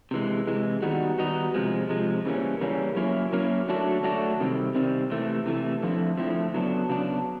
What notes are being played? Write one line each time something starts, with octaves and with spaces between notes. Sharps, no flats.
C3 E3 G#3
C3 E3 G#3
D#3 G3 B3 D#4 F#4
D#3 G3 B3 D#4 F#4
C3 F3 G#3
C3 F3 G#3
C#3 E3 G3 A#3 C#4
C#3 E3 G3 A#3 C#4
F#3 A#3 C#4 E4
F#3 A#3 C#4 E4
D3 F#3 A3 D4 F#4
D3 F#3 A3 D4 F#4
C3 D#3 G3 C4
C3 D#3 G3 C4
C3 E3 A3
C3 E3 A3
D3 F3 A3 C4 E4
D3 F3 A3 C4 E4
C#3 F#3 B3 D4
C#3 F#3 B3 D4